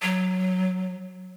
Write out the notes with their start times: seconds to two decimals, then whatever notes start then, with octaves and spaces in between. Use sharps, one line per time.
0.02 F#3